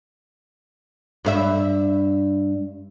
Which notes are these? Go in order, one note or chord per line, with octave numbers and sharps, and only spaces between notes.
G2 A#4 E5